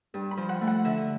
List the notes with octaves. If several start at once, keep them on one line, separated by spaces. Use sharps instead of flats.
G2
B5
F3
F#5
A3
F#5
D3 E5